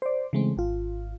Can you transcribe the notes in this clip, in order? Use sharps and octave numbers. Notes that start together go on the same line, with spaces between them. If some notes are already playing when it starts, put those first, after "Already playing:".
C5 D5
C#3 E3 G#3 A3 C4
G#1 F4